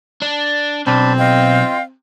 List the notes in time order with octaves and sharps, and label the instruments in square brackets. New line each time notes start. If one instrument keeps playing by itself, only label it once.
[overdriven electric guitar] D4
[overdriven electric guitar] B1 [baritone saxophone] C4 [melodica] D4 A5 B5
[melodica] F4 [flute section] D#5 F5 G5